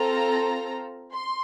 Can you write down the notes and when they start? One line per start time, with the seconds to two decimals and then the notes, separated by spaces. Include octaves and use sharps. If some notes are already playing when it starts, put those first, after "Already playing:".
Already playing: C4 F4 A4 A#5
1.13 C6